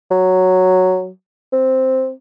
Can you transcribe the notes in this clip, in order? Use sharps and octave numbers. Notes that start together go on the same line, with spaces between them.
F#3
C4